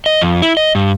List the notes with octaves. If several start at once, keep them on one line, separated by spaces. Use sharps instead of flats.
D#5
F2
E4
D#5
G2